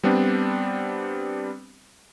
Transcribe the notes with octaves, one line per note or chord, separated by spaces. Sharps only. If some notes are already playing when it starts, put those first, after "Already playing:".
G3 B3 C4 D4